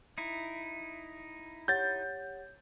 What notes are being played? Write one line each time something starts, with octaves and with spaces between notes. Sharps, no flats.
D#4 E4
G4 C#5 F#5 G6 A6